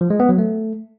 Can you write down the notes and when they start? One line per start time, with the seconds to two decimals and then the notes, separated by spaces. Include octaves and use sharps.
0.01 F3
0.10 G#3
0.20 B3
0.29 F#3
0.38 A3